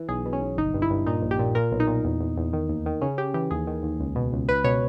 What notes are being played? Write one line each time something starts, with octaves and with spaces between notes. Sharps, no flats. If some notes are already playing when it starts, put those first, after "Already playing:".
Already playing: E3
B1 G#4
B2
C#4
B1
G1 D#4
G2
E4
G2
A#2 D#4
A#1
G4
A#2
A#2 A#4
B1
D#4
A#2
E2
E2
E2
D#3
D#2
D#3
C#3 C#4
C#3 G4
E3 G4
D#2 G#4
D#3
D#2
C#2
B2
C#2
C#2 B4
B2 C#5